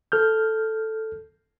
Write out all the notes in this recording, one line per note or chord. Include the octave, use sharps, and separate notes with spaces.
A4 F6 G6